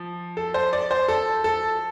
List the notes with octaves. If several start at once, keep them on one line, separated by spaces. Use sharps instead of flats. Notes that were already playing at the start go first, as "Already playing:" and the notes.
Already playing: F3
A4
C5
D5
C5
A4
A4